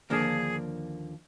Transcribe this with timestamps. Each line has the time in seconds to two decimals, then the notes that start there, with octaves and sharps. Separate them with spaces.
0.10 D#2 D3 F3 A#3 D4 G#4